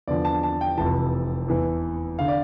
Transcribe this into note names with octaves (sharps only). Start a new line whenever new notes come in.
E2 D3 F3 D5
A5
A5
G5
F1 F2 E3 A5
E2 E3
D3 F5
D5